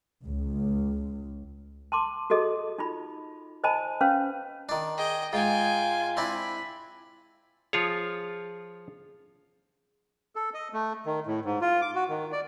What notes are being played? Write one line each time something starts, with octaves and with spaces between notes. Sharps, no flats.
C#2
A5 C6 D6
F#4 G#4 A4 D#5
D#4 F4 B5
C5 D#5 G#5 A5 B5
C#4 B4 C5 F5
D#3 D4
G#4 D#5 G5
G#2 F4 G5 G#5
C4 D4 E4 B5
F3 F4 G#4 C#5
A4
D#5
A3
D#3
A2
G#2
F4
D6
F#4
D#3
D5